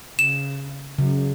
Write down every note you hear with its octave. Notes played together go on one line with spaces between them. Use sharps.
C#3 E7
F#2 C#3